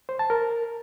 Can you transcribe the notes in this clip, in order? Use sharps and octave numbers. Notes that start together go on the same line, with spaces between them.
C5
A5
A#4